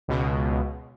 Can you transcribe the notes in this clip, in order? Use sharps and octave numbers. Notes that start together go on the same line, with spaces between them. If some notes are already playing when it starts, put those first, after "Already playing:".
C#2 B2